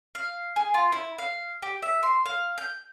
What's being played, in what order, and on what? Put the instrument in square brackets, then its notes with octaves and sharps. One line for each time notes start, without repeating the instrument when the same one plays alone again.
[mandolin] F5
G#4
F4
E4
F5
G4
E5
C6
F5
G6